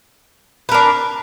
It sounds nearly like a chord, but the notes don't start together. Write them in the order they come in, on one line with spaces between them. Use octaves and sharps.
B4 A#4 D4